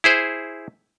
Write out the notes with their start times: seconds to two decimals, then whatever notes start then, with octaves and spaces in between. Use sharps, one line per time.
0.04 E4 G#4 C5